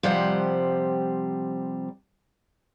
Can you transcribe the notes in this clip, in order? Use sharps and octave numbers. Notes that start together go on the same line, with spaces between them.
C3 F3 G3 C5 F#5